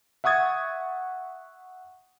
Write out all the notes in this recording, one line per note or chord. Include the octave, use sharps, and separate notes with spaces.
E5 F#5 C#6 D#6 G#6 A6